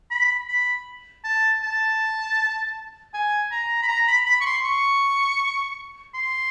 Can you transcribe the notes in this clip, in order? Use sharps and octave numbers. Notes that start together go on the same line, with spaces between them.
B5
B5
A5
A5
G#5
A#5
B5
A#5
B5
B5
C#6
C6
C#6
C6